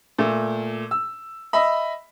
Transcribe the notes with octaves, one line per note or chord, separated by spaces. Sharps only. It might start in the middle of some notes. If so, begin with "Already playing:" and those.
A#2 A3
E6
D#5 E5 B5